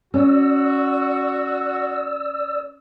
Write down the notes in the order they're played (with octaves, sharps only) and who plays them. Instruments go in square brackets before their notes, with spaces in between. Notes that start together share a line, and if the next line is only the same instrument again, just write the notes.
[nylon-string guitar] C#4 [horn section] F#4 [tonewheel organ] D5 E6